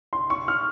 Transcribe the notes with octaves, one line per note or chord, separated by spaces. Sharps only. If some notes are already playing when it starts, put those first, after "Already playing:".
C6
C#6
F6